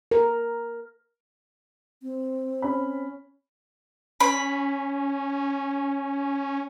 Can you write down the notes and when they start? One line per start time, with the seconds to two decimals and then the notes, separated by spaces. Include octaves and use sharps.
0.11 A#4
2.02 C4
2.62 C#4 B5
4.20 C#4 B5